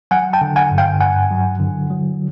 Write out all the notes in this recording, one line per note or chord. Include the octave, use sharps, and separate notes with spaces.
F#3 F#5 G#5
G5 A5
D3
F#5 G#5
G2
F5 G5
G2 F#5 G#5
F#3
D3
F#3